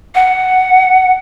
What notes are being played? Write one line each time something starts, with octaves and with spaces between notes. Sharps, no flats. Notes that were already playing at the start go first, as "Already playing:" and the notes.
F#5